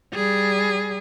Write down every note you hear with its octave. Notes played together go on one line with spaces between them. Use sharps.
G3 G#4